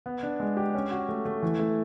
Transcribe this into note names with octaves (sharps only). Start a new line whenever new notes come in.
B3
D4
G#3
G4
C#4
F#4
A3
A3
E3
A3